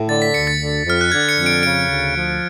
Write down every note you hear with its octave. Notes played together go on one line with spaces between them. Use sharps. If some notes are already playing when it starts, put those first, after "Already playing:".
Already playing: A2
D3 A6
B6
D2 C#7
A6
D3
F2 F6
F#6
D3 G#6
C#7
F2
D7
C#3 D7
D2
F3